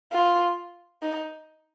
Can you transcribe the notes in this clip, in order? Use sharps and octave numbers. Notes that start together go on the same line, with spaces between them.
F4
D#4